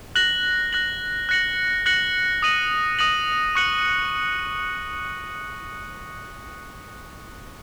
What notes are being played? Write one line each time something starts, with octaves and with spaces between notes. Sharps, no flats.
F#6 A#6 F#7
F#6 A#6 F#7
F#6 A#6 C#7 F#7
F#6 A#6 C#7 F#7
D#6 A#6 D#7 F#7
D#6 A#6 D#7 F#7
C#6 F#6 C#7 F#7